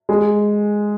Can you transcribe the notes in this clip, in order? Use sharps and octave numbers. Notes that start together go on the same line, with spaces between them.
G#3